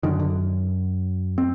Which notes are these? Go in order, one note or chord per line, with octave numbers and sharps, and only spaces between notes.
F#2 D3 D#3
D3
C4